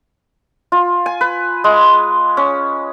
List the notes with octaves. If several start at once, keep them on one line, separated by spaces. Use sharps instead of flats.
F4
G#5
B4
G#3
C#4